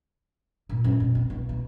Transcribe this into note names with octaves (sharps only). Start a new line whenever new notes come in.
A#2
F#2
B2
C4
B1
B2